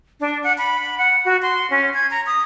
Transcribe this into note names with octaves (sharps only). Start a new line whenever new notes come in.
D4
F#5
B5
F#5
F#4
C6
C#4
G#6
A#5
D#6